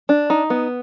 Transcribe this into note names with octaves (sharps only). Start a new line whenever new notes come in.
D4
D#4
B3